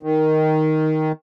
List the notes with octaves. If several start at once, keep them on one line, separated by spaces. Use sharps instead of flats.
D#3